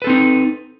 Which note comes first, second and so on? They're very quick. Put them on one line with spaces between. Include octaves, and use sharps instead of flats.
B4 A4 C4 D#4